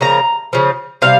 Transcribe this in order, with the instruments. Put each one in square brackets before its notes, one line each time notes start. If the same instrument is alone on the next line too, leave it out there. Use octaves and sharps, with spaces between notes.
[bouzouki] C#3 F3 A#3 A#5
C#3 F3
C3 G3 F5